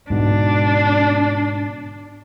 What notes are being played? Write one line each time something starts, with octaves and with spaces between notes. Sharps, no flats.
G#2 B2 D3 D4